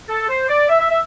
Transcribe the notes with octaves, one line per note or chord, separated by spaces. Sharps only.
A4
C5
D5
E5
E5
E5